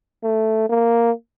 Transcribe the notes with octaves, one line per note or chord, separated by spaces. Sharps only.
A3
A#3